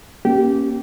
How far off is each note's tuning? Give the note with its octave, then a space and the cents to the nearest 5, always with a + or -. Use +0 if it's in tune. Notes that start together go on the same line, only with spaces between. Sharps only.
A#3 +25 C#4 +0 G4 -15